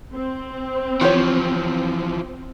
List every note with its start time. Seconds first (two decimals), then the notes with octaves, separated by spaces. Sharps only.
0.13 C4
1.01 E3 F3 F4 G4 C#5